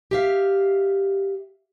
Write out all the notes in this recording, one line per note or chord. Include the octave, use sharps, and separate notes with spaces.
G4 E5 F5